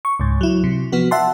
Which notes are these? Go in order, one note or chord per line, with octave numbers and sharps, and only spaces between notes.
C#6
C#2 G#2
F#3 E4
C3
F3 B3 F#4
E5 F#5 A5 C6